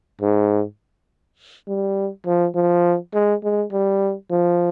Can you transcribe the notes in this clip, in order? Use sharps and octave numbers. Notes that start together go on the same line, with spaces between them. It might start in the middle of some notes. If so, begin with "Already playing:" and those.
G#2
G3
F3
F3
G#3
G#3
G3
F3